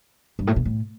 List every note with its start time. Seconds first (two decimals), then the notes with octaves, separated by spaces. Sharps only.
0.39 G2
0.47 A2
0.56 B2
0.65 A2